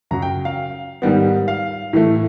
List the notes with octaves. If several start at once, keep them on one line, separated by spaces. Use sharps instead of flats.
F#2 C#3 F#3 A#5
G5
F5
G#2 D#3 G3 B3
F5
A2 E3 A3